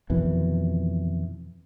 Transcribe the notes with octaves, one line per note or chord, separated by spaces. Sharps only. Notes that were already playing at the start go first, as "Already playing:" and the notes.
F2 B2 D#3 E3